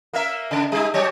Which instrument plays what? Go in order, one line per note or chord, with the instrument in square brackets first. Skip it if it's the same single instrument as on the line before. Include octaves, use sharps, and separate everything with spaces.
[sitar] A#3 A#4 E5
C#3
G3 D#4
F#3 C#5